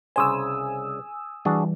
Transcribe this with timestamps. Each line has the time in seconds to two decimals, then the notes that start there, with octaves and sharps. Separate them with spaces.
0.16 C2 C#3 C5 G#5 D#6 E6
1.45 E3 G3 D4 F#4 G#4